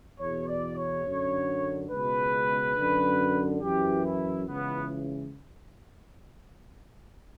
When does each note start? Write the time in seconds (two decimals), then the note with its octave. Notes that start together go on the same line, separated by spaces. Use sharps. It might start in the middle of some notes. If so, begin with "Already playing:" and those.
0.20 E2 B2 C#5
0.48 D5
0.76 C#5
1.05 F#2 D3
1.90 C#2 B2 B4
2.75 F#2 D3
3.61 F#2 E3 G4
4.04 E4
4.47 C#2 C#3 E3 B3